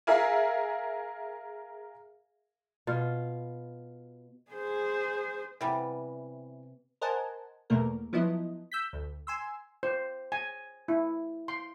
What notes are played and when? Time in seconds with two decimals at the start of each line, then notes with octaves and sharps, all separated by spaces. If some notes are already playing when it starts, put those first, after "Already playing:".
0.07 G#4 A#4 E5 F5 G#5
2.87 B2 F4
4.51 G#4 C5
5.61 C3 E3 G3 B3
7.02 A#4 C5 D#5 F#5 G#5 A5
7.70 E2 B2 A3 A#3 A#4
8.13 F3 F#3 B3 E4 D#5
8.72 E6 G6 B6
8.93 D2
9.27 G#5 C6 E6
9.83 C5
10.32 G#5
10.88 E4
11.48 C6